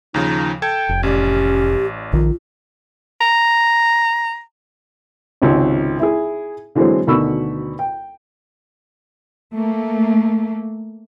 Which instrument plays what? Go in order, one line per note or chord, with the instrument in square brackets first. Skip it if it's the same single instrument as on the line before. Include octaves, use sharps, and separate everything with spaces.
[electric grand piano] D#2 C#3 F3 [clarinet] D#4
[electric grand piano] A4 A5 G#6 [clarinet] G5
[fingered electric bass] F1
[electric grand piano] A1 D5 [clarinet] C#4 [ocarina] G4
[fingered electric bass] A#1 D#3 [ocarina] F4
[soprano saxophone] A#5
[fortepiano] G#1 C#2 C3
E4 G#4
D3 E3 F#3 G#3 C4
D2 B2 D#3 B5 C#6 E6
G5
[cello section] A3 A#3